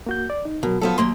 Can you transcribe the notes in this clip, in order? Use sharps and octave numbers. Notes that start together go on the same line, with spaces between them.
A#3 F#4 G6
D5
D#4
B2 F#3 A#4
F3 F#3 B3 A4
D#2 A#3 C6